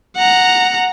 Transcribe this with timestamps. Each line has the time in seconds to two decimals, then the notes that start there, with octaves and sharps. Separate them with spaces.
0.17 F#5 A#5